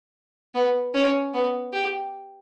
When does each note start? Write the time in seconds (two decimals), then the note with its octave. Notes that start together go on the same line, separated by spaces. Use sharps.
0.54 B3
0.94 C#4
1.34 B3
1.73 G4